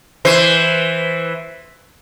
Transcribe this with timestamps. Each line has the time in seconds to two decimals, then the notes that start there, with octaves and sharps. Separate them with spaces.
0.25 E3 C5